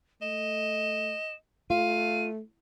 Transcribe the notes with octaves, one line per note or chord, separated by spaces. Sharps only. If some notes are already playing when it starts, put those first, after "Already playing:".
A3 D#5 E7
A3 F4 F5 D#7